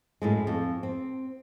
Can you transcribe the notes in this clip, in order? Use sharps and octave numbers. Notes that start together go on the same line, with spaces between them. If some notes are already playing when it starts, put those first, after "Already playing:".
F#2 A2 G#3
F2
C4